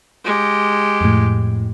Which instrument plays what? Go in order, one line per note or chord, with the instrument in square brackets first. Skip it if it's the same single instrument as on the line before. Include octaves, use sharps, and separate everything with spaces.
[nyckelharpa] G#3 G4
[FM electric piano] F2 A2